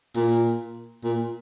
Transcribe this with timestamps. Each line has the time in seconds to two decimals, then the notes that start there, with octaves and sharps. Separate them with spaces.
0.16 A#2
1.04 A#2